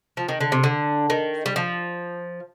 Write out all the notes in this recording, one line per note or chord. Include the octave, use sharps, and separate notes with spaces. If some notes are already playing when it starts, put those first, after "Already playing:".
F3
D#3
D3
C3
D3
D#3
G3
F3